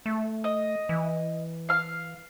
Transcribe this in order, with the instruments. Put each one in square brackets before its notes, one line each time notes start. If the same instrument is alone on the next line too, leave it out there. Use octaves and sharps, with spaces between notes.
[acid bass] A3
[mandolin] D#5
[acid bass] E3
[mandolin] F5 F6